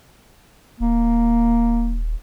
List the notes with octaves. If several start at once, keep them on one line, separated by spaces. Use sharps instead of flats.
D#1 A#3